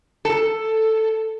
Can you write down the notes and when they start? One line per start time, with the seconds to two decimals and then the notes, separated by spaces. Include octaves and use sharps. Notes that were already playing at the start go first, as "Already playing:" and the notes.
0.25 A4